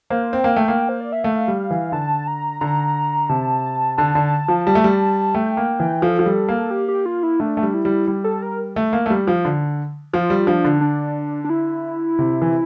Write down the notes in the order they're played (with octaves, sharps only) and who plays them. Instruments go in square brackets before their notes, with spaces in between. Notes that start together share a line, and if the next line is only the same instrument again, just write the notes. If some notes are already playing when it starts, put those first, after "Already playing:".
[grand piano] A#3 [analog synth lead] C5
[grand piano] C4 [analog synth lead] G5
[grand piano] A#3
[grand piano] A3 [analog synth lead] G5
[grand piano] A#3
[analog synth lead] C5
D5
E5
[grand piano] A3 [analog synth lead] F5
[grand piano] G3
E3
[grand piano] D3 [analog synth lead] A5
[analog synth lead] A#5
[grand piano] D3 [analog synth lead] A#5
[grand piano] C3 [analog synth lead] A5
[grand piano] D3 [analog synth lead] A5
[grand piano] D3
F3
[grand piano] G3 [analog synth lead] A5
[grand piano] A3
G3
[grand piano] A3 [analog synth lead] G5
[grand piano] A#3
E3
[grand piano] F3 [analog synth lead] A4
[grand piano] F3
G3
A#3
[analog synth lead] G4
G4
F4
E4
[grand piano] A3 [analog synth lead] D4
[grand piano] A3
G3
[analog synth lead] E4
[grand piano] G3
G3
[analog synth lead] A4
A#4
[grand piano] A3
A#3
A3
G3
F3
D3
[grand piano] F3 [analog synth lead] F4
[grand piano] G3
[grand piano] F3 [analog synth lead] D4
[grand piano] D3
[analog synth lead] D4
D4
E4
[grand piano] C3
E3